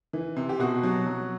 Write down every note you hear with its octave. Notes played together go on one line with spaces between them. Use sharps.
E3
C3
G4
B2 F#4
F#3
F#3